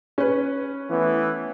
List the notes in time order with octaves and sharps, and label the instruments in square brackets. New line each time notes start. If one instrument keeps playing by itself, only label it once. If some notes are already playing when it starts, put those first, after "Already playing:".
[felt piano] C#4 B4
[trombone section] E3 A3 B3